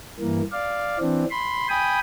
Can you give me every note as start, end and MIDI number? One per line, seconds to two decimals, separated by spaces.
0.20 0.42 43
0.20 0.42 52
0.20 0.42 58
0.52 0.98 74
0.52 0.98 77
1.00 1.25 52
1.00 1.25 60
1.00 1.25 62
1.31 1.68 83
1.31 1.68 84
1.69 1.99 79
1.69 1.99 80
1.69 1.99 83
1.69 1.99 87